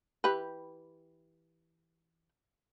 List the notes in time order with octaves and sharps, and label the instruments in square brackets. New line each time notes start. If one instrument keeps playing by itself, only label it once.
[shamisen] E3 G4 B4